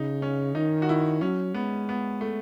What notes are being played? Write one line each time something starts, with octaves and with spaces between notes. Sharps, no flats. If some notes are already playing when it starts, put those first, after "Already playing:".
Already playing: C#3 D#4
C#4
D#3 D#4
F#4
E4
F#3 C#4
G#3 B3
B3
A3